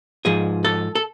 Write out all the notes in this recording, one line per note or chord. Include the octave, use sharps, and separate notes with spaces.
G#2 F3 G#4
A4
A4